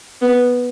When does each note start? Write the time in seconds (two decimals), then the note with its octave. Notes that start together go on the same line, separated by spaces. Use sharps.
0.22 B3